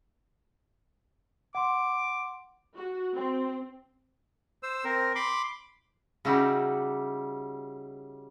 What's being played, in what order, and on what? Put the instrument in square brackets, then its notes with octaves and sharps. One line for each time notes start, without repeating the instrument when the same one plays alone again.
[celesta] F#5 C6 [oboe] D6
[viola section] F#4
C4
[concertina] C5 E6
C4 A#4
B5 C6 D6
[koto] C#3 G3 D#4 E4 F#4 G4